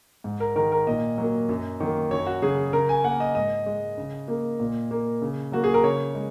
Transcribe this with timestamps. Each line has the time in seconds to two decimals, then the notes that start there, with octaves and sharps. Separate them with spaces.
0.24 G#2
0.40 A#4
0.56 D#3 G#3 A#4
0.72 A#4
0.87 A#2 D#5
1.18 F#3 A#3
1.49 F#2
1.80 D#3 F#3 A#3
2.11 F#2 C#5
2.27 F#4
2.42 C#3 F#3 G#4
2.73 C#3 A#4
2.89 G#5
3.04 A#3 F#5
3.20 D#5
3.35 G#2 D#5
3.66 G#3
3.98 C#3
4.28 A#3
4.60 A#2
4.91 A#3
5.22 C#3
5.52 F#3 A#3 F#4
5.64 G#4
5.74 A#4
5.84 C#3 C#5
6.15 G#3